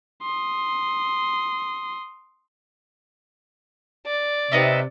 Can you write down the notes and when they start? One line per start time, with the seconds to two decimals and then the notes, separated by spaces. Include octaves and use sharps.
0.22 C6 D#6
4.06 D5
4.52 C3 B3 D#4 E5